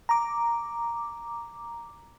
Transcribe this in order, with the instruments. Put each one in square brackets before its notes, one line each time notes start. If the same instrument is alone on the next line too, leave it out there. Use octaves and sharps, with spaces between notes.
[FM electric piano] A#5 D6